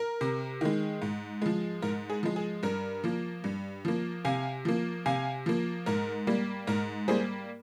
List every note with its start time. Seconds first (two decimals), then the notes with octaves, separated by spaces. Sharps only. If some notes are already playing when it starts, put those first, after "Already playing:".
Already playing: A#4
0.21 C3
0.61 D#3 G#3
1.02 G#2
1.42 F3 G#3
1.82 G#2 A#4
2.10 G#4
2.23 F3 G#3
2.36 G#4
2.63 G2 A#4
3.04 F3 A#3
3.44 G2
3.85 F3 A#3
4.25 C3 F5 G#5
4.65 F3 A#3
5.06 C3 F5 G#5
5.46 F3 A#3
5.86 G#2 A#4
6.27 G3 A#3
6.67 G#2 A#4
7.08 G3 A#3 G#4 C5